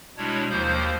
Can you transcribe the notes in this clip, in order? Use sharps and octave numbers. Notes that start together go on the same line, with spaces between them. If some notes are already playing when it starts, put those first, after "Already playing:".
B2 G3 G#3 D4 E4 C#5
D#2 F3 A#3 C5 G6